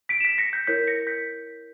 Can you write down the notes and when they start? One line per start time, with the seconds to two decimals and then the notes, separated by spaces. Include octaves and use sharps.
0.09 B6 D7
0.20 E7
0.24 B6 D7
0.38 A#6 C#7
0.53 G6 B6
0.67 E4 A#4 C#5 G6 B6
0.87 A#6 C#7
1.07 G6 B6